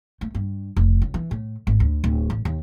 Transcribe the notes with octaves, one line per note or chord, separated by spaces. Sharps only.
A3
G2
F1
C#2
E3
A2
G#1
D2
D1
A1
D#2